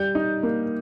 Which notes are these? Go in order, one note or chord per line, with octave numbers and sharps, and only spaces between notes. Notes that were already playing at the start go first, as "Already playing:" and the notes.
Already playing: G3 G6
D#4
A#3